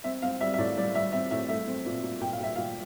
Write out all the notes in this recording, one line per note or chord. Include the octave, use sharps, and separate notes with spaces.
C4 E5
C4 F5
G3 E5
E5
A2 D5
G3 D5
G3 E5
C4 E5
A2 E5
A3 E5
C4
A#2
A#2
A#2 G5
F5
A#2 E5
A#2 F5